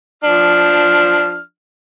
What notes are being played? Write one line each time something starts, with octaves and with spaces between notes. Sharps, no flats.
F3 D4 F6